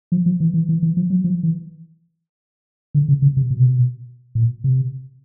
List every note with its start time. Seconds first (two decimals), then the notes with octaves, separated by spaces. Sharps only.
0.12 F3
0.26 F3
0.40 E3
0.54 E3
0.69 E3
0.83 E3
0.97 F3
1.10 F#3
1.24 F3
1.43 E3
2.95 D3
3.08 C#3
3.22 C#3
3.37 C3
3.50 B2
3.59 C3
3.66 B2
4.35 A#2
4.64 C3